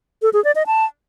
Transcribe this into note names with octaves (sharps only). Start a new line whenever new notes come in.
A4
G#4
D5
D#5
A5